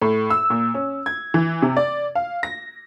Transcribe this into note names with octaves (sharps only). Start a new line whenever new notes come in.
A2
E6
A#2
C#4
G#6
E3
C3
D5
F5
A#6